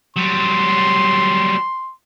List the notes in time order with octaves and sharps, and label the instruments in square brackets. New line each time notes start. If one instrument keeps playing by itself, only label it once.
[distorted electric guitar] F#3 G3 [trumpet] C6